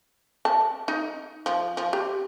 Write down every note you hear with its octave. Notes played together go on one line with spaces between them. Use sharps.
A5
D#4
F3
F3
G4